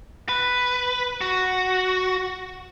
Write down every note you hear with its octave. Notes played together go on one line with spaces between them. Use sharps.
B4
F#4